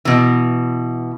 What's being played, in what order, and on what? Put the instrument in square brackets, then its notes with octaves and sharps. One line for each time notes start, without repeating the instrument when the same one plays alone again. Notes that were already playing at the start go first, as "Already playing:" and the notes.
[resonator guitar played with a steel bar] B2 E3